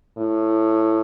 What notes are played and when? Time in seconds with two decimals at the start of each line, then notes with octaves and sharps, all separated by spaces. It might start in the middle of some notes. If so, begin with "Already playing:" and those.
0.18 A2